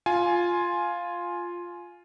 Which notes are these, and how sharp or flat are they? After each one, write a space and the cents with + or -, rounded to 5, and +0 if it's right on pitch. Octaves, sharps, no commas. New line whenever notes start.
F4 +0 G#5 +15